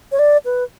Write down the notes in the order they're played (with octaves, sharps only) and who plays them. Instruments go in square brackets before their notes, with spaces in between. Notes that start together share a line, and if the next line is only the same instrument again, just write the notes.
[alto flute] C#5
D5
B4